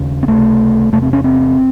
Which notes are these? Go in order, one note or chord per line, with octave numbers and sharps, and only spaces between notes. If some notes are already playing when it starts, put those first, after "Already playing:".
Already playing: D#2 C#3
C4
C#2 C3 A3
E2 C3 A3
C4
C#4
C4